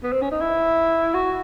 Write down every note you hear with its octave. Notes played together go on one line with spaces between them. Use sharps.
B3
C4
C#4
D#4
E4
F#4